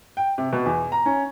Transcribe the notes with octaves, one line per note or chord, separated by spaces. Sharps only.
G5
C3
B2
E2
A#5
C#4